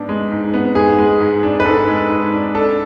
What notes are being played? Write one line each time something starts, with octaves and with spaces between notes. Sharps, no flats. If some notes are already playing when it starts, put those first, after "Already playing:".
Already playing: G#2 B3 D4
G#3
G#2
B3
G#2 G#4
G#3
G#2
D4
B4
G#2 A4
G#3
G#2
D4
D4 A4